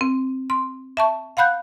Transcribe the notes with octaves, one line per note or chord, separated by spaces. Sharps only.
C4
C6
E5 A5 C#6
F5 F#5 B5 F#6 G6